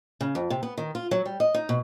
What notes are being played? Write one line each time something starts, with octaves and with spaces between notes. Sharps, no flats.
C#3
F2
C3
B3
D#3
F4
F#3
G3
D#5
D#4
B2